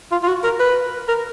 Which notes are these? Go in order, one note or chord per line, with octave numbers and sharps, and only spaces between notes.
F4
F4
F#4
A#4
B4
A#4